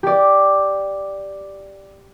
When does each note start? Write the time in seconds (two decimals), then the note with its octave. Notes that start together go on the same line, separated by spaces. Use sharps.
0.03 G4 D5